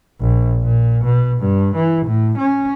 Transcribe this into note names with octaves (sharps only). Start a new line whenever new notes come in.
A#1
A#2
B2
G2
E3
A2
C#4